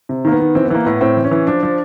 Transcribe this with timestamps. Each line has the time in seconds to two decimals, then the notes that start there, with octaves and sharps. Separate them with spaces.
0.09 C3
0.25 D#3 A#3
0.32 B3
0.40 D#3
0.55 E3 C4
0.65 B3
0.70 E3 A#3
0.85 A2 B3
1.01 A2 C4
1.17 E3
1.24 C#4
1.31 E3
1.47 F3 D4
1.63 F3